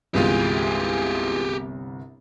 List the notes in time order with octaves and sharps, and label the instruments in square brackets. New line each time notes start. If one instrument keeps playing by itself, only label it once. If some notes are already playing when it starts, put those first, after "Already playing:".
[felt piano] G1 C2 [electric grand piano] E3 G#3 F4 [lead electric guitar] G4 G#4